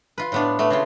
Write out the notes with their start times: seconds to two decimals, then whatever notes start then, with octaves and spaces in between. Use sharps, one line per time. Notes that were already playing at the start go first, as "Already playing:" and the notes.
0.18 F4 B4
0.32 A2 B3 D4
0.59 A3 B3
0.70 C#3 A3 F4